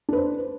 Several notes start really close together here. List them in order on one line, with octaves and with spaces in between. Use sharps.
D4 B4 C5